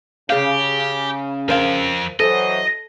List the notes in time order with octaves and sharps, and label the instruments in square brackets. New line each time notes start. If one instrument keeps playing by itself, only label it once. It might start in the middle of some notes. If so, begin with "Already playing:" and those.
[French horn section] C#3 [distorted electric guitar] G4 [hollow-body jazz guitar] G#4 F5
[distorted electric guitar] F3 G5 [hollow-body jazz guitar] A#4 C5 F5
[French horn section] E3 F#3 C5 [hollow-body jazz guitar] A4 [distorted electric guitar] D#5